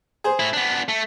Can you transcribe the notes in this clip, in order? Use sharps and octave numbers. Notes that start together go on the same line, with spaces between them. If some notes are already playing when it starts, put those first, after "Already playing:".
G#4 C5
A2 E4
B3 D4
A3